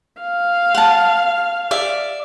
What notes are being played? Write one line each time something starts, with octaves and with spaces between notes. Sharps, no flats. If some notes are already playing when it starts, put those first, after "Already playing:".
F5
F#5 A5
D5 E5